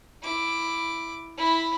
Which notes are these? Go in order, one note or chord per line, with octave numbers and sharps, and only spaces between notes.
E4 D6
E4 B5